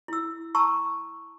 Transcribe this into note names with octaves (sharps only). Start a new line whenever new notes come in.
E4 E6
A5 A#5 C#6 E6